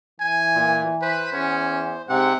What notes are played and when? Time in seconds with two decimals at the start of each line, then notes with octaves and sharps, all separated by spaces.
0.20 E3 G#5
0.55 A#2
1.02 B4 C5
1.33 E2 C#4
2.09 G#2 C3 C4 F#5